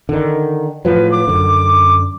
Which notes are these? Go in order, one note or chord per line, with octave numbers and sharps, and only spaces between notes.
D3 D#3
A2 F3 F#3 B4
D6
F#2 D3